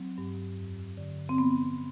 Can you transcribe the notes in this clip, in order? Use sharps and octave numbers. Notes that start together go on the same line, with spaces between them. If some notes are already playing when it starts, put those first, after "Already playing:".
Already playing: F#3 C4
G2
F2
D3
C4
F3 B3